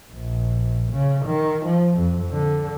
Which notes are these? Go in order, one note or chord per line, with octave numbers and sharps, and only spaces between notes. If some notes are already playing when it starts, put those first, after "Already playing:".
A#1
C#3
D#3
F3
F2
D3